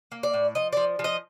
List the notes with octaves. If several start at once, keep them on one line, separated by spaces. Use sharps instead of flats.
A#3
D5
A2
F3 D#5
F3 D5
F3
D#5